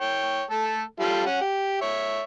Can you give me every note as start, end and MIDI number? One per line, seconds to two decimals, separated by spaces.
0.01 0.43 73
0.01 0.43 79
0.50 0.82 57
0.50 0.82 69
1.00 1.24 55
1.00 1.24 65
1.00 1.24 69
1.26 1.39 61
1.26 1.39 78
1.41 1.81 67
1.81 2.22 73
1.81 2.22 76